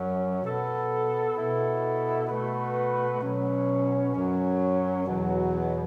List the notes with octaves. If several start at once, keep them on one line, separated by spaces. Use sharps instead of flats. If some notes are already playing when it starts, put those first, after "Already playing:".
Already playing: F#2 F#3 C#4
B2 B3 A4
B2 B3 E4 A4
B2 A3 F#4 B4
B2 F#3 C#4
F#2 F#3 C#4
E2 B2 F#3